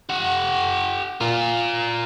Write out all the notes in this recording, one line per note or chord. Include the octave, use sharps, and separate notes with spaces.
G4 F#5
F4 A#4